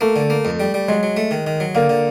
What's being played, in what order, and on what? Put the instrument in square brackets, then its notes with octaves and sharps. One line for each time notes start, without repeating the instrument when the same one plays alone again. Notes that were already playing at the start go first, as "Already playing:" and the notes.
[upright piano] A3 [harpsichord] A#3
[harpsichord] D3
A#3
F2
G3
G3
[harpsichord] F#3 [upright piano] G#3
[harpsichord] F#3
A3
D#3
D#3
F#3
[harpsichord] D3 [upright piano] A#3
[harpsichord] D3